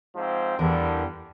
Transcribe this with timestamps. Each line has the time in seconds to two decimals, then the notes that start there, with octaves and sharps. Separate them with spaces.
0.16 G#2 F3 C4
0.59 E2 G2 D3 G3 A#4